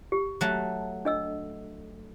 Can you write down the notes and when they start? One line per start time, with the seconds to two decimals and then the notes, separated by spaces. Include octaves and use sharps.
0.12 G4
0.41 F#3 A3
1.05 D4 D#5 E6